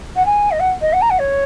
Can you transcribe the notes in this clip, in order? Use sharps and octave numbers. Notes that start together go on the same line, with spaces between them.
F#5
G#5
D#5
F#5
D#5
F#5
A#5
F#5
C#5